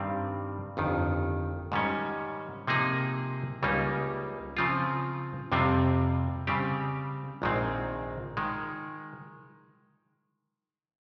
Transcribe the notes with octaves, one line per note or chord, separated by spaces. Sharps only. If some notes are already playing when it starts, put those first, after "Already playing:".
Already playing: G2 D#3 G3 C4
G1 F2 D#3
G#2 D#3 G3 C#4
C3 F3 A#3 D#4 G#4
C#2 C#3 G3 A#3 D#4
C#3 F3 C4 F4
F2 C3 G3 C4 F4
C#3 G3 C4 G4
A#1 G#2 D#3 G#3 C4
D#3 G#3